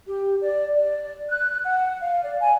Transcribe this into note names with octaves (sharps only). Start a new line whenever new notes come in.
G4
D5
D5
F#6
F#5
F5
D5
G#5